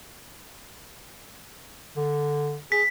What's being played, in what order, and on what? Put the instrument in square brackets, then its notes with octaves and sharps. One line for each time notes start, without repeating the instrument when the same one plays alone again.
[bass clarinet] D3
[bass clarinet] G#4 [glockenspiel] B6